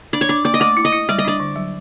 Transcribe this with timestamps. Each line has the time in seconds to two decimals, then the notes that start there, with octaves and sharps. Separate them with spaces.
0.13 D4 D5
0.21 C#5
0.29 D4 D5
0.45 A#3 D5
0.54 D#5
0.60 A3 D5
0.77 E4
0.85 D#5
0.92 E4
1.09 G3 D5
1.18 D#5
1.25 D4 D5
1.40 D3
1.56 F#3